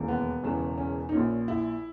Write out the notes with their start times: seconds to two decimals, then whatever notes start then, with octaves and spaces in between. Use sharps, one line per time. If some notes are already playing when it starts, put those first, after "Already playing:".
Already playing: E1 D#2 C#3 E3
0.08 B3
0.43 E1 E2 C#3 E3
0.78 C#4
1.09 D#4
1.13 A#1 A#2 C#4
1.48 E4